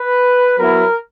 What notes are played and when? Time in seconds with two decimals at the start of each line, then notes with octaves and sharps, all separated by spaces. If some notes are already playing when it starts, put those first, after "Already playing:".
Already playing: B4
0.58 F#3 B3 E4 A#4